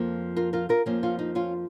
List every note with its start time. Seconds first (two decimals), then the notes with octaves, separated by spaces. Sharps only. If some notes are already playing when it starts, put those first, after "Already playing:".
Already playing: F2 F3 A#3
0.37 F4 A#4
0.53 F4 A#4
0.69 F4 A#4
0.86 F2 F3 A#3 C#4
1.03 C#4 F4
1.19 D#4
1.35 C#4 F4